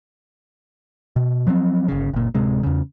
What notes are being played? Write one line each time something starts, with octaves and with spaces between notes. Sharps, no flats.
B2
F3 F#3 A3 C4
G1 C#3
F#1 A#2
D1 C3 G#3
E2 C#3